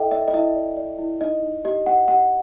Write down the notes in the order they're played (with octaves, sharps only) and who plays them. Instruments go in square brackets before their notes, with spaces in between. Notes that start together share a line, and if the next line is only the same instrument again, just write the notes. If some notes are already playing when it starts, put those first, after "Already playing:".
Already playing: [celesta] E4 A4 D#5 E5 G5
D5 E5
D#5
E4 E5
D5
D5
E4
D#4 D#5
D#4
G4 D#5
G4 F#5
G4 F#5